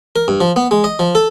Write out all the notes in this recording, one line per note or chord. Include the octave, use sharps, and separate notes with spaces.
A#4
G2
F3
B3
G#3
D#5
F3
A4